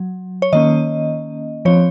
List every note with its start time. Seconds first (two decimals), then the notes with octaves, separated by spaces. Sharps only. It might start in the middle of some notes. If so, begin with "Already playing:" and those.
Already playing: F#3
0.42 C#5
0.53 D#3 A#3 C#4 D#5
1.65 F3 C4 C#5